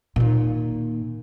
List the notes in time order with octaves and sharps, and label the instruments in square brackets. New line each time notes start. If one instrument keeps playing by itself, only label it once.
[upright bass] A#2 D#3